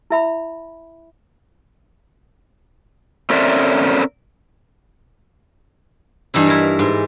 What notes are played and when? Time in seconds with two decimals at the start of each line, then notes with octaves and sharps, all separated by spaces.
0.10 E4 E5 B5
3.30 C4 C#4 A4 A#4 D5 E5
6.34 G2 E3 D#4 E4
6.47 E4 A#4
6.79 G#2